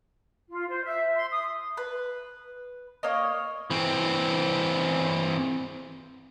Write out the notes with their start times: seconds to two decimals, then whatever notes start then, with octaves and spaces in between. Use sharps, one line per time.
0.50 F4
0.67 C5
0.83 E5
1.14 C6
1.31 D#6
1.77 B4
3.03 A#3 C#5 D#5
3.70 E3 C4